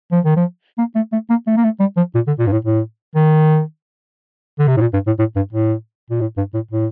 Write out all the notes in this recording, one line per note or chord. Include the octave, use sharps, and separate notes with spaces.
F3
D#3
F3
A#3
A3
A3
A#3
A3
A#3
A3
G3
F3
A#2
D3
A#2
G2
A2
A2
D#3
D3
C3
A2
A#2
G2
A2
A2
G2
A2
A#2
A2
G2
A2
A2